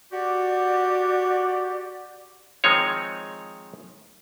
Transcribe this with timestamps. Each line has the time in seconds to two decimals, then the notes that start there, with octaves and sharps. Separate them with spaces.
0.11 F#4 G4 D5
2.64 D#3 F3 G#3 C4 D#4 C#5